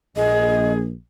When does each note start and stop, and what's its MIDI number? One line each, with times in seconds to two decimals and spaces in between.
0.16 0.93 34
0.16 0.79 68
0.16 0.72 75